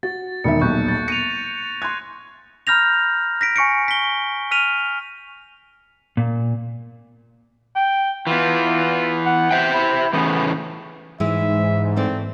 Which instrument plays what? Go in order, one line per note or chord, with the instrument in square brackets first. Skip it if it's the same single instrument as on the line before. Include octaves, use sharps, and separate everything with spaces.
[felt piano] F#4 [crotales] A6
[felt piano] E1 D#3 E5 [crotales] C#7
[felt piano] D#1 B1 [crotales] C#6 F#6 G6
[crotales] A6
[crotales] A#6 D#7 F7 [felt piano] C#7
[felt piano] C6 G#6 [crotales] F#6
[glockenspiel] A#5 B5 F6 G6 A#6 F7
A#6 B6 D7
G#5 C#6 C#7 D7
B6 G7
F6 B6 D#7 F7
[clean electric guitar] A#2
[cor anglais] G5
[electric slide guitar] E3 B3 [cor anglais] F4
[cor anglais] F#5
[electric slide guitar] C5 E5 G5
[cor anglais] E4
[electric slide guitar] A2 C#3 E3 [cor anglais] B3
[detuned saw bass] G#2 [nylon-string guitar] E3 G#3 [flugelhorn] E5
[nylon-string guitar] E3 A3 D5 [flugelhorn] C4